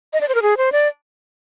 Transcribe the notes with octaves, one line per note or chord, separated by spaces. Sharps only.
D#5
D5
C5
A#4
G#4
C5
D5